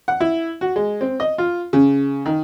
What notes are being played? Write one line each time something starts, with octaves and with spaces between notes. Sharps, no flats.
F#5
E4
F#4
G#3
C4
D#5
F4
C#3
D#3